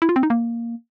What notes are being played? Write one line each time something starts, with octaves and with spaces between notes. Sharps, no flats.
E4
F4
C4
D#4
A#3